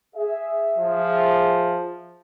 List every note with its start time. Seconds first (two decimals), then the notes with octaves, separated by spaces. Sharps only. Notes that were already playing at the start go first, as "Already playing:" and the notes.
0.15 G#4 E5
0.78 F3